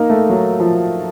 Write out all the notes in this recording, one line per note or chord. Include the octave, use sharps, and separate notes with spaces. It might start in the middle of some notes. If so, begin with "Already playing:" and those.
Already playing: A#3 D#4
A3
F#3
F3